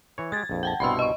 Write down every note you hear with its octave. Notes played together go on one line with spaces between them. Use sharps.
E3 C#5
G#3 G4 G#6 A6
A#1 F2
F#5 G5 A5
C2 G2 B2 B5 C6 E6
D#5 C#6